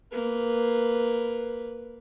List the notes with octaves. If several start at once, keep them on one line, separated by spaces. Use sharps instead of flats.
A#3 B4